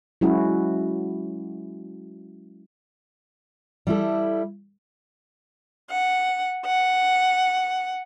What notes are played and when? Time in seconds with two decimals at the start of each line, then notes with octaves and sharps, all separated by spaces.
0.21 F#3 G#3 C#4 E4 F#4
3.87 G3 E4 A4
5.90 F#5
6.66 F#5